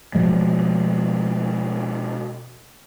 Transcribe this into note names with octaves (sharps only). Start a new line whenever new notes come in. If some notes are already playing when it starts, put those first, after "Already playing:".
B2 F3 G#3